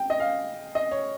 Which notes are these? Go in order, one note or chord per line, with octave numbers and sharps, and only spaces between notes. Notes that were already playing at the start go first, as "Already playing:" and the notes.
Already playing: G5
D#5
F5
D#5
C#5